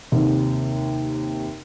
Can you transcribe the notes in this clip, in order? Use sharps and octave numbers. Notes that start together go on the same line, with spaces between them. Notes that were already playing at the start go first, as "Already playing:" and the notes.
D#2 C3